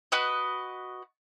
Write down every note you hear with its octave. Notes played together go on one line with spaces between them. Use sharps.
F#4 B4 D#5